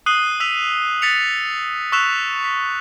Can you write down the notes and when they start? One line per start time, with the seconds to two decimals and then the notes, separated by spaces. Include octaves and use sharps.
0.06 D#6 F#6 C7 D#7 G7
0.40 E6 B6 D#7 F7
1.02 F#6 A6 B6 C#7 F7
1.92 C#6 E6 F#6 B6 E7 F7
2.44 B6